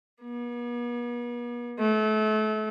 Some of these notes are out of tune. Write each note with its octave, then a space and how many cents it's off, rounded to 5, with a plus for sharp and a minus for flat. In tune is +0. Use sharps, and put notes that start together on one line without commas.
B3 -45
A3 -30